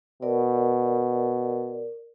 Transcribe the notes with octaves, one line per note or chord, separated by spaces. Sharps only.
B2 A#4 D5